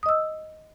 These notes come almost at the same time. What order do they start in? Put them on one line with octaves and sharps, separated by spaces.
D#6 D#5 E6